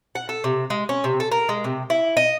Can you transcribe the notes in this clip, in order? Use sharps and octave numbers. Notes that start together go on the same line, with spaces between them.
F#5
A4
C3
G#3
C#4
C3
A4
A#4
G#3
C3
E4
D#5